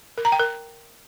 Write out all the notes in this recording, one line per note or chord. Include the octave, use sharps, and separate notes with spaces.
A#4
A#5
G5
A#4